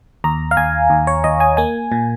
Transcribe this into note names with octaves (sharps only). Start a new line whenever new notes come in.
D#2 A#5
F5
D#2 G#5
D#2
C#5
D#2 D#5
G#5
A#3 G#5
A#2